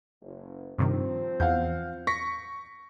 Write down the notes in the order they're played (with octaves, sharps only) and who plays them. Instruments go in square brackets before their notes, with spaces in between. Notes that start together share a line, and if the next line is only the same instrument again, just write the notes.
[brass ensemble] F#1
[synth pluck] G2 C3 D#3 [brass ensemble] F3 C4
[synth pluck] E2 [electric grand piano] F5 F#5 G6
[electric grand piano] C#6 A#6 B6